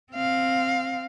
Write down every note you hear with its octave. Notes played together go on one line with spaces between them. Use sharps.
C4 F5